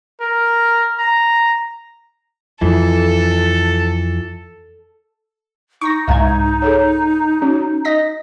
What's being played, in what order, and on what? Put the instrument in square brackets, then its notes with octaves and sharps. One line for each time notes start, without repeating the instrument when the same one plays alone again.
[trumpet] A#4
A#5
[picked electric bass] F2 E3 [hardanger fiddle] A4
[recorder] D#4 [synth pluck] C#6 A#6
[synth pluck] C2 G#2 G#6 [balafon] E5 F5 A#5
[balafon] G#4 A4 C#5
[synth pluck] C#4 [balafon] F#4
[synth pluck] D#5 A#6 B6